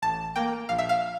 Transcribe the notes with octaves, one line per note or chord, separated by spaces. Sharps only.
A1 A5
A#3 G5
A#1 F5
E5
F5